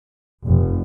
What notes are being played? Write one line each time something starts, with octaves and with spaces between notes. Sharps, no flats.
F1